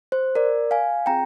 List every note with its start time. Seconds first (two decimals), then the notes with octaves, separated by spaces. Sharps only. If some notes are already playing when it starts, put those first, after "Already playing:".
0.12 C5
0.35 A#4 D5
0.71 F5 G#5
1.06 C4 F4 G#4 G5 A#5